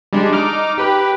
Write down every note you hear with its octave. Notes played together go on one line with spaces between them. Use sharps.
G3 G#3 D4
D#4 D6 F6
G4 B4